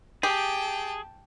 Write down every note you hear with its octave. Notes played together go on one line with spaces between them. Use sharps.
G4 G#4 G5 A5